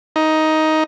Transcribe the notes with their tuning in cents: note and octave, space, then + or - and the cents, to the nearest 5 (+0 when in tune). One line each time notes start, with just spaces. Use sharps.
D#4 +10